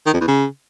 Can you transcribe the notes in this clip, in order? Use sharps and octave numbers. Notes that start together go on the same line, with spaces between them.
D#3
F2
E2
C#3